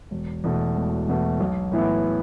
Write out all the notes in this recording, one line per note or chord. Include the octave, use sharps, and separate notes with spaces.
E1
E2 B2 A3
E1
E2 B2 A3
B1
A2 E3 B3 E4